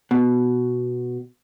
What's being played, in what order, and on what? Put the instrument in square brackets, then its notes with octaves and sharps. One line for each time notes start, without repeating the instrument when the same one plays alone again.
[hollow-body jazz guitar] B2